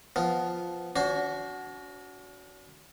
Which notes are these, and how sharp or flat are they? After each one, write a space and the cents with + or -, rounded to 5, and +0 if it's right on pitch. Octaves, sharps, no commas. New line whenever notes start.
F3 +0 B3 +10 F4 +0
D4 -45 F#4 +0 C5 +0